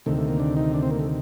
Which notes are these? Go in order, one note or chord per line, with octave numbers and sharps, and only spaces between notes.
D2 C3 D#3 A3
A3
A#3
D4
D#4
D4
C4
A#3
A3